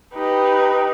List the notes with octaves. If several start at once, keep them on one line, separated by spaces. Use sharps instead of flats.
D#4 G4 B4